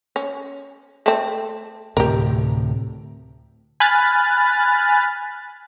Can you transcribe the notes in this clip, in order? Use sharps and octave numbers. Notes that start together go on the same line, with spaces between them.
C#4
A3 C4
D2 A2 C3 G4 A#4
G#5 B5 F6 F#6 A6